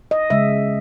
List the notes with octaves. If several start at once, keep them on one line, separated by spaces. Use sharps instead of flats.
D#5
C#3 G#3 E5